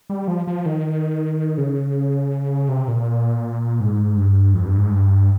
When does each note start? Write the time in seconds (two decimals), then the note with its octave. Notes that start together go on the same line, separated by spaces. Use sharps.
0.10 G3
0.28 F3
0.47 F3
0.66 D#3
1.58 C#3
2.69 C3
2.88 A#2
3.80 G#2
4.17 G2
4.54 F2
4.67 G2
4.78 G#2
4.91 G2